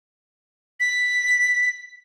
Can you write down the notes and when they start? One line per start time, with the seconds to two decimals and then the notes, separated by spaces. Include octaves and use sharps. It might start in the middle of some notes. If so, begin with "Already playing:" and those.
0.80 B6